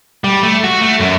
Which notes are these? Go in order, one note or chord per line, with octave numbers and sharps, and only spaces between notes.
G3
A3
F#4
A3
F#2